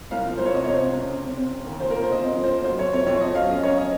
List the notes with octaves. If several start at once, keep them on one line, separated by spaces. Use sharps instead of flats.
C2 F5
F3
C2 C5
C#5
C3 D#5
C#5
C3
C5
C3
C#3
C4
C4
C4
C4
D#2
A#2 C5
A#4
A#2
C5
A#2 D#5
C4
F3
C5
A#2
F#3 C5
F2 C#5
C4 C#5
F2 C#5
F2 D#5
F#3 F5
C#4 D#5
F#2 C#5
C#4 D#5